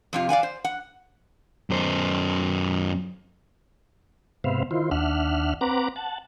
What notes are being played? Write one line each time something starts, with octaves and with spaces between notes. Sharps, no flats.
F2 C3 F4
D5 F5 F#5 G#5
C5
F#5
F#2 C5
G#2 C3 B3 C5 E5 F5
D#3 E4 F4 C5
D#2 D4 E5 F#5 F6
C4 B4 F#5 A#5 D6
F#5 A5